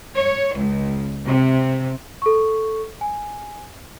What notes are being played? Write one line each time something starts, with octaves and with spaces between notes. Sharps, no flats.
C#5
C#2
C3
A4 C#6
G#5